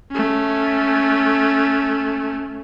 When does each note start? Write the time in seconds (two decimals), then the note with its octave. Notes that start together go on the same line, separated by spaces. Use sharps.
0.12 A3 C#4